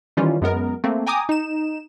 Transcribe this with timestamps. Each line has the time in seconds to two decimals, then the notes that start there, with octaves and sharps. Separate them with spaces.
0.17 D#3 E3 G3 C#4 F4
0.42 F#2 G#3 B3 A#4
0.84 A3 A#3 C4
1.07 G5 G#5 A#5 D6 D#6
1.29 D#4 E7